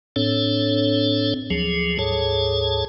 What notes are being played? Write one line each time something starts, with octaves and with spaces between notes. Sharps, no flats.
A2 C4 D4 A4 C#5
D2 F3 F#3 G#4
D2 G#2 G#4 A4 C#5 A5